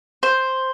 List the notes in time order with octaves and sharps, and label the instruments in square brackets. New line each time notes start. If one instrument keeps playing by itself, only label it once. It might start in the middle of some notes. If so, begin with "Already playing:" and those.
[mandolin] C5